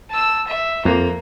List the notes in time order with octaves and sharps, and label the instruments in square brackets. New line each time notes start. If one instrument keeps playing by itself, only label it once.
[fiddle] A5 E6
E5
[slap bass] F2 [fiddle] A#3